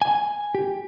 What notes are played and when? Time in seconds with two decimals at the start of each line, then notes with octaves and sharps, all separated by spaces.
0.02 G#5
0.55 G4